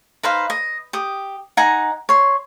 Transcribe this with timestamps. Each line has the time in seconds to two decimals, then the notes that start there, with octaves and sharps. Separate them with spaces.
0.23 D#4 B4 C5 F5
0.50 D#5
0.93 G4 D#6
1.57 D#4 F#5 G#5 A#5
2.09 C#5 C6